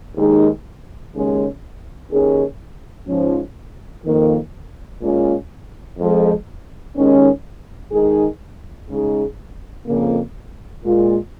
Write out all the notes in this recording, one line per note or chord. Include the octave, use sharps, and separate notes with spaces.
D#2 D#3 G#3 D#4 G#4
D#2 C#3 G#3 C#4
D#2 D#3 C#4 G#4
G#2 F3 C#4
F2 D#3 A#3
A#2 G#3 C#4 F4
F2 F3 G#3
D#2 D#3 G#3 C#4
D#3 G#3 D#4 G#4
C#3 G#3 D#4 G#4
F2 C#3 A#3
A#2 G#3 F4